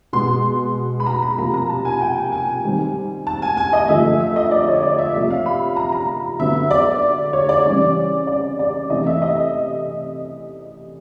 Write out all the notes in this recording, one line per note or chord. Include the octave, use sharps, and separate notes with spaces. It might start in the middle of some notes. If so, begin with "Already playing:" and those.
B2 G#3 B3 C6
B5
A#5
B5
C3 F3 A#3 A#5
A#5
A5
G#5
G5
G#5
D#3 G3 C4
A5
G#5
G#5
D#5
D3 F3 A3 E5
E5
D#5
D5
C#5
D5
E5
C3 F3 A#3 E5
F5
B5
A#5
A#5
D3 F#3 B3 E5
D5
C#5
D5
C#3 E3 G3 C4
D5
D5
C3 E3 A3 C4 D#5
E5
D#5